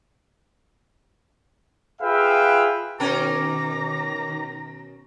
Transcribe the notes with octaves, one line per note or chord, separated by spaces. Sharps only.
F4 G#4 B4 E5 F5 G5
B2 D#3 C#4 A#4 A#5 D6